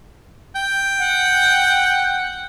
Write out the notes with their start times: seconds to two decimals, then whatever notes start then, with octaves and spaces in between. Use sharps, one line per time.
0.56 G5
0.99 F#5